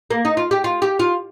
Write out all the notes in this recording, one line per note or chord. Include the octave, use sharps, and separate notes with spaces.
A#3
D#4
F4
G4
F4
G4
F4